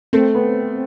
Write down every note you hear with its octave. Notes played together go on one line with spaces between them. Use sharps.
A3 C4
B3